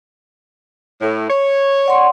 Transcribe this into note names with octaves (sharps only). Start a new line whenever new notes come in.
A2
C#5
D5 F#5 C6